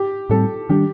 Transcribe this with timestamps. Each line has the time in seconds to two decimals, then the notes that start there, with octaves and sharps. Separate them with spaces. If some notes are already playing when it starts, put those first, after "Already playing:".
Already playing: G4
0.30 A2 G3 C4 A4
0.69 D#3 G3 D4 G4